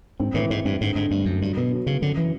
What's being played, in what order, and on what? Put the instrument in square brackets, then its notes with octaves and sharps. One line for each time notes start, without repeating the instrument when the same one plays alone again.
[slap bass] G#2 [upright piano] C4
[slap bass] A2 [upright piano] E3
[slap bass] G#2 [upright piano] E3
[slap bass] G2 [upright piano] C4
[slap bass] G#2 [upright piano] D3
[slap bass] G#2 [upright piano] D3
[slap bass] G2 [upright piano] A3
[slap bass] F#2 [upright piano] D3
[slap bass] G2 [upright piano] F#3
[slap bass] B2 [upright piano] B3
[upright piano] F#3
[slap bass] C#3 [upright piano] F#3
[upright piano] F#2 [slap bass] D3
[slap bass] E3